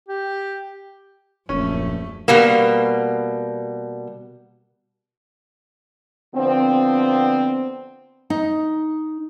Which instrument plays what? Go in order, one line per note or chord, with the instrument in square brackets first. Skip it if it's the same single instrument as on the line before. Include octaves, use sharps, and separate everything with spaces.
[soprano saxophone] G4
[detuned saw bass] D#1 [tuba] A#1 [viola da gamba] F#2 A3 [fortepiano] C#4
[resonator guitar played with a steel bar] B2 G3 A#3
[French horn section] D3 F3 B3 C4
[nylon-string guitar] D#4